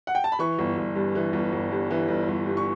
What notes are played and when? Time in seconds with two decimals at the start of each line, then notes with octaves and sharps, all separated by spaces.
0.07 F#5
0.15 G5
0.24 A5
0.32 B5
0.39 E3 C#6
0.59 G1
0.78 G1
0.95 G2
1.15 E3
1.33 G1
1.53 G1
1.71 G2
1.91 E3
2.08 G1
2.28 G1
2.47 G2
2.57 C#6